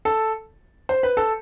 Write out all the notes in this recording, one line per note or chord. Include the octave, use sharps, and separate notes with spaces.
A4
C5
B4
A4